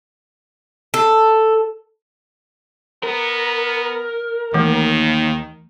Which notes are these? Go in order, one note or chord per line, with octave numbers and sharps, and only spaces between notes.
A4
B3 A#4
D#2 D#3 E3 A3